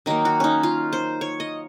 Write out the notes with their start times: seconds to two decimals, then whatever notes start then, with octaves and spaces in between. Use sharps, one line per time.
0.06 D#3 F#3 A#3 D#4
0.25 F#4
0.40 C#4 D#4
0.63 F4
0.93 C5
1.21 C#5
1.40 D#5